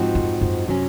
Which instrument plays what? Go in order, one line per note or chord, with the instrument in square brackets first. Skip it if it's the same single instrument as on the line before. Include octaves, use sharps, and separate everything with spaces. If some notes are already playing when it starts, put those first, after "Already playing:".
Already playing: [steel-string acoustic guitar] G#2 F3 C4 D#4 F#4
[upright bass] F2
F#2
[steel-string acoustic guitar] C3 F#3 C#4